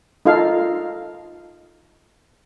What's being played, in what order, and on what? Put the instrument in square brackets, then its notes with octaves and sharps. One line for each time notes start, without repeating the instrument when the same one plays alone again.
[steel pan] D#4 F4 A4 F5